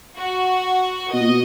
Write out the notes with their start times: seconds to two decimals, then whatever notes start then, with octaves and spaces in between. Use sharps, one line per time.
0.18 F#4
1.12 B2 D#5
1.20 A#2
1.28 B2